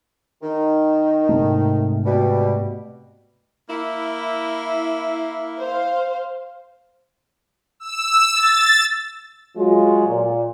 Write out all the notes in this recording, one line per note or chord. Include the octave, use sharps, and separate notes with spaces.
D#3
G#2 C3 A3
B2 G3
A#3 E4
C5 F5
E6
A6
F#3 G#3 F4
A#2